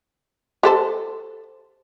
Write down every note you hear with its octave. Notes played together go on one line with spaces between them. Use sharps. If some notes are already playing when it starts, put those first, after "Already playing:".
G4 A4 C5